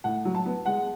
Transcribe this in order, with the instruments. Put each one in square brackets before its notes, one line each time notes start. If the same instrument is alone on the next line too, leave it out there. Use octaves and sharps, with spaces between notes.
[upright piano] A2 F#5
F#3
A5
B3
G#3 F#5